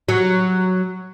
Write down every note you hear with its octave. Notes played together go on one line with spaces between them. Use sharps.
F#3